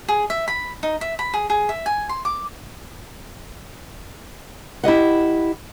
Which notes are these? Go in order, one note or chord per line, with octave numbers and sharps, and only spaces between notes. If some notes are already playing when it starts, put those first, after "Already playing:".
G#4
E5
B5
D#4
E5
B5
G#4
G#4
E5
G#5
C6
D6
E4 G4 D#5 F#5